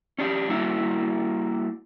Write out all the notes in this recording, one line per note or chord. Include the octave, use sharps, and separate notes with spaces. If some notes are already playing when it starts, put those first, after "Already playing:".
C#4 D4 G4
G3 A#3 E4 F#4